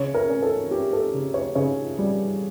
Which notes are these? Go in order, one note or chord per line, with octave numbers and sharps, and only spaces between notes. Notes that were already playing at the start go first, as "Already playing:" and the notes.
Already playing: C#3 C#5
A#4
C#4
A4
C#4 G4
A4
C#3
C#5
C#3 C#5
G3